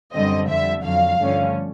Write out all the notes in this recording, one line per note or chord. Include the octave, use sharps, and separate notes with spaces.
F#2 D3 G3 C4 D#5
F2 D3 G3 E5
F2 D3 F#3 F5
G2 D3 F3 A3 C#4